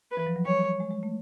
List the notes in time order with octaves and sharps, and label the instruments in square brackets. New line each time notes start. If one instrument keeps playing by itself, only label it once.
[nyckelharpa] B4
[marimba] E3
F3
F#3
[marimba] G3 [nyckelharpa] C#5
[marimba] G#3
G#3
A3